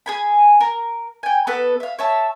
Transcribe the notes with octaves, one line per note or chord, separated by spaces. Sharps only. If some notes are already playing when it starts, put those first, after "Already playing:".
G#4 G#5 B5
A#4
G5 G#5
B3 A4 B4
E5 F5
C#5 E5 A5